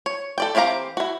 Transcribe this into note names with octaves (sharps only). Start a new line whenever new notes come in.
C#5
A4 D5 G5
E3 C4 G4 F5 A#5
E4 F#4